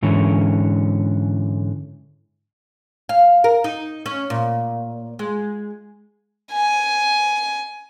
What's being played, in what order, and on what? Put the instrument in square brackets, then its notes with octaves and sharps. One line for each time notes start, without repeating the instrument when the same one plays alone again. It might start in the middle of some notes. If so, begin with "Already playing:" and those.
[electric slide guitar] G#2 D3 E3 C#4
[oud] F5
A#4
D#4
C#4
A#2
G#3
[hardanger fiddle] G#5